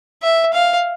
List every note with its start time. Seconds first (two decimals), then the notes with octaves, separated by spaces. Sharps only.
0.23 E5
0.54 F5